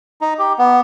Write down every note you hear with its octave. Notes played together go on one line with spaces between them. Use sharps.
D#4
G4
B3